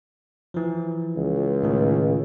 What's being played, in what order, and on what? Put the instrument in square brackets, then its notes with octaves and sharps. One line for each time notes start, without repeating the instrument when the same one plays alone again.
[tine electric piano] E3 F3
[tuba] C#2
[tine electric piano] A2 D#3